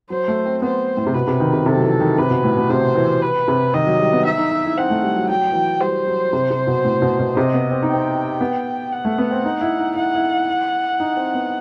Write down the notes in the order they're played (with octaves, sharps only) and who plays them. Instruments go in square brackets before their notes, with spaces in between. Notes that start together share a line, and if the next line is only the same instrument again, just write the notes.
[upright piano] F#3 [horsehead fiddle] C5
[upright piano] A3
C4
[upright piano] B3 [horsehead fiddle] C5
[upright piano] A2
C3
[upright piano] B2 [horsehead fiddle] B4
[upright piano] C3
D#3
C3
[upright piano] C3 [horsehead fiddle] A4
[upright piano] F#3
E3
D#3
[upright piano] C3 [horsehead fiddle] B4
[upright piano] B2
A2
B2
[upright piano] C3 [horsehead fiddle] C5
[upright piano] E3
[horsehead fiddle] B4
[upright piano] C3
[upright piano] D#3 [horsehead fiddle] D#5
[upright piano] F#3
G3
B3
[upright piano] D#4 [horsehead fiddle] E5
[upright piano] D#4
D#4
E4
[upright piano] C4 [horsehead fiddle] F#5
[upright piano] A3
G3
F#3
[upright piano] F#3 [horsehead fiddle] G5
[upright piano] E3
F#3
[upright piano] G3 [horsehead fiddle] C5
[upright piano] F#3
C3
C3
B2
A2
B2
B2
[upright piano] C3 [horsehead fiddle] D#5
[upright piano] B3
C4
D#4
[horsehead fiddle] G5
[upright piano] C4
B3
[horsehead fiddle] F#5
[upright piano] A3
B3
C4
D#4
E4
D#4
[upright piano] E4 [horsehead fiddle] F#5
[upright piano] E4
D#4
C4
B3